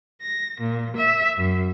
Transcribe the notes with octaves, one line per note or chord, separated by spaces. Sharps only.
A#6
A#2
E5
F#2